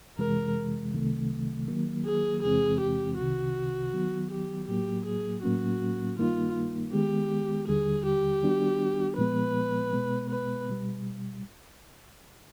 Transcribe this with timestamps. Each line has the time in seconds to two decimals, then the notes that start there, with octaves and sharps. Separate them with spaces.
0.18 F2 C3 E3 G#3 A#4
0.93 C2 C3 D#3 F#3 A3
1.68 D#3 F#3 A#3
2.06 G#4
2.43 E2 C3 E3 G#3 C4 G#4
2.80 G4
3.18 C2 C3 D#3 F#4
3.93 D#3 F#3 B3
4.30 G4
4.68 A2 F#3 A#3 G4
5.05 G#4
5.43 A2 F#3 A#3 C#4 F#4
6.17 G2 D#3 G3 A#3 D#4 F4
6.93 D#3 G#3 B3 G4
7.67 D#2 D3 G3 G#4
8.05 G4
8.43 D#3 G3 B3 D4 F#4
9.17 A#2 F3 G#3 B3 B4
9.93 B2 G#3 B3
10.30 B4
10.69 B2 G3